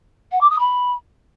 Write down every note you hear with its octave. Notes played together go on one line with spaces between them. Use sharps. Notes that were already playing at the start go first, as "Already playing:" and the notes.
F#5
D6
D#6
B5